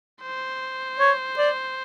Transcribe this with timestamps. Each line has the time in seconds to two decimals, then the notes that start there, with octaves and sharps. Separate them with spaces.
0.22 C5
1.00 C#5
1.38 D5